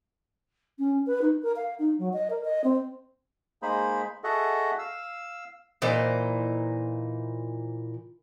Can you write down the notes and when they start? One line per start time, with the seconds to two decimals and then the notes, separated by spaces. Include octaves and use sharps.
0.79 C#4
1.06 B4
1.21 D#4
1.42 A#4
1.56 F5
1.79 D#4
1.98 F#3
2.13 D#5
2.30 A#4
2.44 D#5
2.64 C4
3.62 G#3 A#3 D#4 G#4 C5 B5
4.24 F#4 G#4 A4 D#5 E5 F#5
4.79 F5 E6
5.82 A#2 E3 D#4 C5